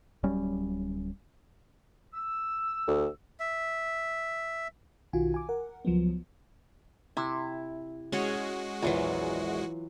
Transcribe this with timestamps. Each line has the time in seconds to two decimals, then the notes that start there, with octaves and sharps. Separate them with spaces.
0.23 D1 F#3 G3 C#4
2.14 E6
2.88 D2
3.40 E5
5.13 B1 D#3 F4 F#4 G#5
5.34 G#5 D6
5.49 A#4 F#5
5.85 C#2 F3 F#3 B3
7.17 C3 E4
8.12 G#3 C#4 F#4 G#4 C#5
8.82 A#1 E2 E3 F#3 F4